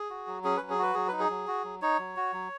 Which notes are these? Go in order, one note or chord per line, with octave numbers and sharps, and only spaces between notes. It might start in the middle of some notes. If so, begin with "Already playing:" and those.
Already playing: G#4
F#4
F#3
C#4 G#4
F#3 B4
G#4
F#4 B4
F#3 G#4
D#4 B4
G#4
F#3
F#4
F#3
D#4 C#5
F#3
F#4
F#3